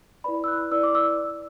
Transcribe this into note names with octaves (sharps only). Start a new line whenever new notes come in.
E4 B4 D5 B5
E6
F#6
E4 B4 D5 E6
D6
E6